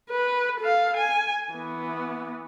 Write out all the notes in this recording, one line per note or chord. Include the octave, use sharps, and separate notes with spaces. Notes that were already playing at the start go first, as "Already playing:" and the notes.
B4
A4 F5
G#5
E3 B3